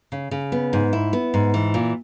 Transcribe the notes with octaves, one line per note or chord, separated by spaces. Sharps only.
C#3
C#3
B3
G#2
E4
B3
G#2
E3
A#2